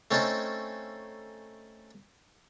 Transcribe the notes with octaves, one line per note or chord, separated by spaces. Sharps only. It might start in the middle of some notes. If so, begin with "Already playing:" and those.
A3 C4 C#4 D#4 A4